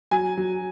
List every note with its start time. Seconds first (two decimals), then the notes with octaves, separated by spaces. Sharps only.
0.11 F#3 G#5
0.37 F#3